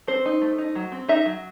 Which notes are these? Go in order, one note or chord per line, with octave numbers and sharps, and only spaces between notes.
C4 C5
D#4
A3
D#4
F#3
C4
D#4 E5
F#3